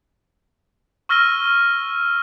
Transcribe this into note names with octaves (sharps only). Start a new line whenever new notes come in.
C#6 E6 F6 A#6 D#7 G7